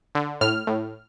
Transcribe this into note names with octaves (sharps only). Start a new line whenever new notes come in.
D3
A2 F6
A2